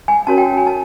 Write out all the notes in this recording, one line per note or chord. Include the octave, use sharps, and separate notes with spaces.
G#5
C#4 F#4 A#4 C#5 A5
G5
G#5
A5